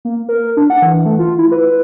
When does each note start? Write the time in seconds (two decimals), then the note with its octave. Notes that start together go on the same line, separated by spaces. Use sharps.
0.05 A#3
0.29 A#4
0.57 D4
0.70 F#5
0.82 E3
1.06 A3
1.19 F4
1.38 E4
1.52 B4